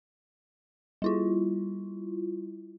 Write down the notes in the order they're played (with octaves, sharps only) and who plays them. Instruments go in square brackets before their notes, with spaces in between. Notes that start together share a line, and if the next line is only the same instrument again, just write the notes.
[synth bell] G3 E4 F4